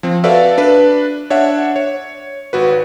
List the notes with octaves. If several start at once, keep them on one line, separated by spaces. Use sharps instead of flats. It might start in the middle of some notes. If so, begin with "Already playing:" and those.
F3 C4
F#4 A4 B4 D5 E5 F5
D4 B4
D4 C#5 E5 F#5
C#5
G#1 F#4 B4